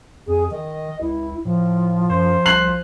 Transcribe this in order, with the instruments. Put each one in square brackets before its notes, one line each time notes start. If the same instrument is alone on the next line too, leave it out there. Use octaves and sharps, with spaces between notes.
[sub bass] F2 [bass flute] G#4
[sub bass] D#3 [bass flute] D#5
[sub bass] C#2 [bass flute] E4
[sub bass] A2 [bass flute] F3
[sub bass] F#2 [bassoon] C5
[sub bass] C2 [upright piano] F#6 C7 F#7